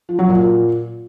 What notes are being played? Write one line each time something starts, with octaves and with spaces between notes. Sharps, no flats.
F3
F#3
A#2